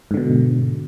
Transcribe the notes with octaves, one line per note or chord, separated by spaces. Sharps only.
G#2 B2 D3